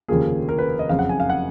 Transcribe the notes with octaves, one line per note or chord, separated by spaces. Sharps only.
F1 D#2 C#3 F3 A#3 G#4
A#4
B4
D#5
F#1 F2 C#3 F5
F#5
G#5
F5
F#5